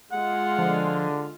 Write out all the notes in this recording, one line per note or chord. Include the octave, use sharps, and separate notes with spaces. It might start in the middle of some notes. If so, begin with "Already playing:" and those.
G#3 F4 F#5
D3 F3